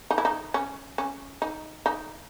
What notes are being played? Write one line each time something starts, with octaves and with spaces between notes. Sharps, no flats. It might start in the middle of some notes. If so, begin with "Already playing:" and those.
D#4
E4
D#4
C#4
C#4
D#4
D#4